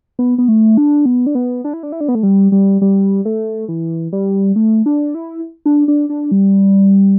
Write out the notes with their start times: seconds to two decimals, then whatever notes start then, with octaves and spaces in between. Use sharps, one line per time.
0.19 B3
0.38 B3
0.48 A3
0.77 D4
1.06 B3
1.26 D4
1.35 B3
1.64 D4
1.73 E4
1.83 D4
1.92 E4
2.01 D4
2.08 B3
2.15 A3
2.23 G3
2.52 G3
2.82 G3
3.25 A3
3.68 E3
4.12 G3
4.56 A3
4.86 D4
5.15 E4
5.66 D4
5.88 D4
6.09 D4
6.31 G3